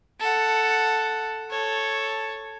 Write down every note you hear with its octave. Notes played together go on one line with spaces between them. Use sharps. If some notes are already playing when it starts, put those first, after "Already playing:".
A4 F#5
A4 C#5